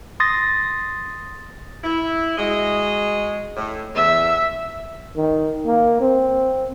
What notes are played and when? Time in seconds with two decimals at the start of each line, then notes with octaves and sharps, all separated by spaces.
0.20 C6 D#6 A6 A#6
1.84 E4
2.38 G#3 F#4 D#5
3.56 A2
3.95 E2 E5
5.16 D#3
5.66 A#3
6.01 C4